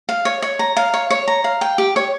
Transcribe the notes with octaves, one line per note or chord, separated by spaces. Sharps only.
F5
C#5
C#5
A#5
F5
C#5
C#5
A#5
F5
G5
G4
C#5